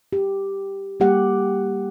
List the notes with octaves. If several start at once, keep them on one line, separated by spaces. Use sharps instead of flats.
G4
G3 A#3 G4 F#5